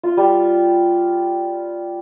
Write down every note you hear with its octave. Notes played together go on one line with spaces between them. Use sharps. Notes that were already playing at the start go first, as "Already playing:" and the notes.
F4
G3